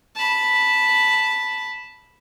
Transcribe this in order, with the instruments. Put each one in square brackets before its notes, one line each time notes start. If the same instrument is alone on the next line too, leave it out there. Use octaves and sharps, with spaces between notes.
[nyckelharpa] A5 B5